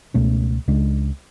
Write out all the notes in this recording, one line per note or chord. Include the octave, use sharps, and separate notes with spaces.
C#2 B2 A3 C#4
C#2 C#3 G#3 D4